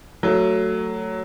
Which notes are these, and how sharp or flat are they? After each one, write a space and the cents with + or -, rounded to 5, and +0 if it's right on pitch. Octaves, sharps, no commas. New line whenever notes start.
F#3 +5 A3 +25